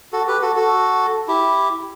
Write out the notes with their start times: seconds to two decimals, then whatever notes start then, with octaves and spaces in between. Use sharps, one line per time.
0.13 F#4 A4
0.27 G4 B4
0.42 F#4 A4
0.56 F#4 A4
1.28 E4 G4